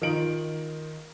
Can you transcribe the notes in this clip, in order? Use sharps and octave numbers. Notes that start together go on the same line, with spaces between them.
D#3 F4 D#5 D7 F#7